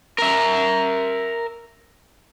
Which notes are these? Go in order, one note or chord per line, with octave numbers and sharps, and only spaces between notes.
A#4 E5